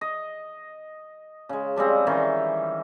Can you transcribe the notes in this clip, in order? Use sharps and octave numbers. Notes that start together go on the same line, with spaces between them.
D#5
C#3 G#3
F3 G3 G#3 C4
D#3 E3 G3 C#4